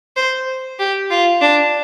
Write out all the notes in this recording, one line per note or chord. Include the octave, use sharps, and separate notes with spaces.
C5
G4
F4
D4